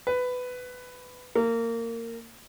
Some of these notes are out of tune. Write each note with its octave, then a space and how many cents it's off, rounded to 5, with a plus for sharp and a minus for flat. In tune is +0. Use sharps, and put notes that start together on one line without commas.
B4 +15
A#3 -20